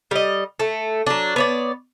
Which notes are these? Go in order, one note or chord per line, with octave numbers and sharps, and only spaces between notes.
G3 D#5
A3
F#3 D4
B3 C#5 D5